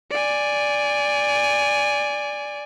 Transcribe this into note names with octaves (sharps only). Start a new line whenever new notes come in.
D5 G#5